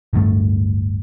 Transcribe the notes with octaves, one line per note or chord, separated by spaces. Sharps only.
D1 D2 G2 A3